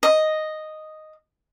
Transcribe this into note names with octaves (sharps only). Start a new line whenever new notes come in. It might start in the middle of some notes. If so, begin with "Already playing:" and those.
D#5